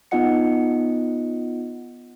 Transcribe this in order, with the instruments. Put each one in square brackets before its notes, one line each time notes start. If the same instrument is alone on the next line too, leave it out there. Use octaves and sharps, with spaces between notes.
[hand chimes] B3 D#4 F4 D#5 F#5 C#7